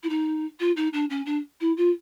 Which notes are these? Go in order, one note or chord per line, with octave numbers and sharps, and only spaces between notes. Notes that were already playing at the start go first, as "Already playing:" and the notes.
E4
D#4
F4
D#4
D4
C#4
D4
E4
F4